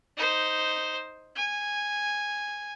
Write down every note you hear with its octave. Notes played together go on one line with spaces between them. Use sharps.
D#4 C5
G#5